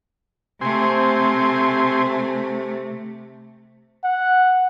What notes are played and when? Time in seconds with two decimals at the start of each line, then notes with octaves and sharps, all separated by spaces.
0.61 C3 A3 C4 G#5 C6
4.04 F#5